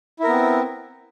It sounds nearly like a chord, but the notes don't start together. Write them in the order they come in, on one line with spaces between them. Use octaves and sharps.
E4 A#4 B3 C4